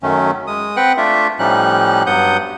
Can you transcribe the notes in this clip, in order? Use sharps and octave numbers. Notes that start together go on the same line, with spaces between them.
F#2 D#3 F#3 A3 C#4
G#3 D#6
C4 B4 F#5 G5 F#6
A3 D4 F4 E5
A2 F3 G3 C#4 D#4 F#6
G2 F#3 B3 F#5 D#6 G6